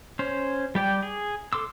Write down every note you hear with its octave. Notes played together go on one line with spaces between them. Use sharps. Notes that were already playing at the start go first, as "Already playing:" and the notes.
C#4 C5
G3 G4 D5 G5
G#4
A4 C6 D6 E6